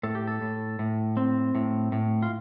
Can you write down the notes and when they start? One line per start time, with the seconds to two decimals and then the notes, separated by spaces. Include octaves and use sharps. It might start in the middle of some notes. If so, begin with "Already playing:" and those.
0.03 A2 A4
0.15 G4
0.27 A4
0.42 A2
0.79 A2
1.17 C4
1.55 A2
1.92 A2
2.23 F4